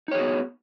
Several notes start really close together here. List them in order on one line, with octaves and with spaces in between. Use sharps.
D#4 C#5 G#4 F#4 B3